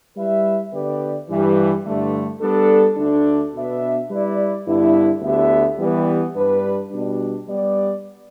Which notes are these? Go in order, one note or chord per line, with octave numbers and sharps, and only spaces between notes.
G3 E4 B4 E5
D3 B3 G4 B4 D5
G2 E3 G3
G2 D3 A3
G3 B3 D4 A4
D2 D3 A3 D4
B2 B3 D4 B4 E5
G3 E4 B4 D5
G2 D3 B3 E4
D2 D3 B3 G4 E5
E3 G3 B3
G2 G3 D4 B4
B2 G3 D4
G3 B3 G4 D5